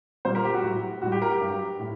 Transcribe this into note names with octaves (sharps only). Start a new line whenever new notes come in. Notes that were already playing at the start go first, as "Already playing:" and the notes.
A#2 G3 C5
A#4
G4
F#4
A2 F#3
A2 G3 F#4
G4
A#4
G4
G2 F#3
A2